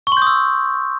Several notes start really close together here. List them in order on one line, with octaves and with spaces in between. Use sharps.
C#6 C6 G6 D#6 E6